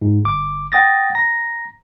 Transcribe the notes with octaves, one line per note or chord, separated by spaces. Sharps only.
G#2
G1 D6
F#5 G5 D#6 A6 A#6
A#5 A#6